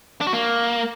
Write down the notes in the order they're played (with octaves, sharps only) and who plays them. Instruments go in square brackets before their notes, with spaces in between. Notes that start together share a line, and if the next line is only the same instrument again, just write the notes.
[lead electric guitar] D4
F#4
A#3